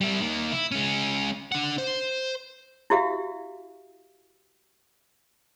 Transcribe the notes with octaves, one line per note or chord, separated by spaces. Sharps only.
G3 E4
D#3 A#3
E4
G#3 C#4
D4 F#5
C5
E4 F#4 G4 E5 F5